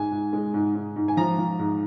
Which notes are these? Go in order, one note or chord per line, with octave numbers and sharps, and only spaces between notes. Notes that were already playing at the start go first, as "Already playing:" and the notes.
Already playing: G#2 G#5
G#2
G#3
G#2
G#2
G#2
G#5
F3 A#5
F3
G#2